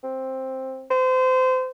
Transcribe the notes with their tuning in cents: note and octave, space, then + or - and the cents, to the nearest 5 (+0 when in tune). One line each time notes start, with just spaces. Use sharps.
C4 +10
C5 -30